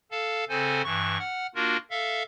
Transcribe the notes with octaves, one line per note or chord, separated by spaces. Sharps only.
A4 F5 A5
C#3 C4 A4 C5 G#5
G2 E3 C#6
F#5 F6
A#3 D4 F4 F#4 A#4
A4 E5 F5